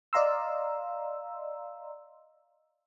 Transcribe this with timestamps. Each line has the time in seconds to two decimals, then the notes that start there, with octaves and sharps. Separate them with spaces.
0.13 D5 D#5 F5 A#5 C6 E6